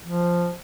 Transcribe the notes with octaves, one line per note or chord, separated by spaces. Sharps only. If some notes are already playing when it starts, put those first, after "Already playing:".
F3